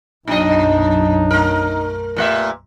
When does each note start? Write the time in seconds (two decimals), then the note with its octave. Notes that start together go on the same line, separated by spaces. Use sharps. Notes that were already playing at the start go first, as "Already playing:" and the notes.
0.28 B1 F#2 A#2 F#3 D4 D#4 D#5
1.31 A3 A#4
2.16 A#2 A3 A#3 G4 B4 E5